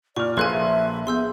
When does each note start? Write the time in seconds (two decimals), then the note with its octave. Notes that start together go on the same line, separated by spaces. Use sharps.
0.16 A#2 D5 C#6 F6
0.37 A#1 G#4 A4 B4 F5 G#5 C6 F#6
0.51 E5
1.07 B3 G#4 C6 E6 G6